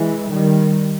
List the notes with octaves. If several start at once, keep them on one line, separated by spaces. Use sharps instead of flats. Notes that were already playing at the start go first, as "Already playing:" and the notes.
Already playing: E3 G#3
D#3 G3